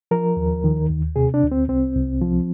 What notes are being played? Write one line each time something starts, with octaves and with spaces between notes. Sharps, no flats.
F3 A#4
D#2
D#3
D#2
C3 G#4
D4
D2
C4
C2 C4
C2
F3